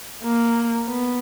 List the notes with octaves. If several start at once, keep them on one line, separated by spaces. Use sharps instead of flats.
A#3
B3